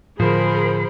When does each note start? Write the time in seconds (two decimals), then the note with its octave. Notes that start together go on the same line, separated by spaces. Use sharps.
0.20 A2 D3 F3 G#4 A#4 C5 B5